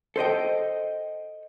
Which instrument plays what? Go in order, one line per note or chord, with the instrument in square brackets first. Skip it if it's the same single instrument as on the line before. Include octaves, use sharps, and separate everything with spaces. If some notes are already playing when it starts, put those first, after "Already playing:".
[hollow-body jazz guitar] A4 C5 D#5 G5